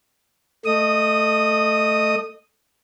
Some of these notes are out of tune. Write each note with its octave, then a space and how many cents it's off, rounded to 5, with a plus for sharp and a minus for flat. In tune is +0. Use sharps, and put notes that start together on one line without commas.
A3 +0 D#5 -20 D#6 +0